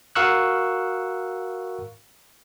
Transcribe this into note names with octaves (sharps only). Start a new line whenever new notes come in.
F#4 A#4 F5 C#6 E6 F#6